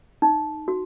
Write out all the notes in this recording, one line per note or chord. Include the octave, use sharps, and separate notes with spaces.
D#4
F#4